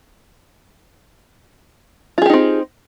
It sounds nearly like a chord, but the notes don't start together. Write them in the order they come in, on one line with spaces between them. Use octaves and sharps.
F4 G#4 G4 D#4 C4